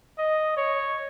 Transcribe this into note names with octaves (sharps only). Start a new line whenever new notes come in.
D#5
C#5